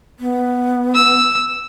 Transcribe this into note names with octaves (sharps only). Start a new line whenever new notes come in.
B3
E6